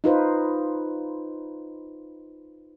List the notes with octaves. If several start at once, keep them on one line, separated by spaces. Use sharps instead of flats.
D#4 F4 B4 C5